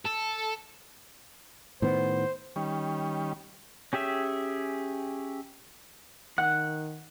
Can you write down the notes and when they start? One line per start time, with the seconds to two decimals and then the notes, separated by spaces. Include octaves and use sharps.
0.05 A4
1.82 A2 D#3 B3 C5
2.56 D#3 G3 C#4
3.93 C#4 G4 G#4 E5
6.38 D#3 F#5 F#6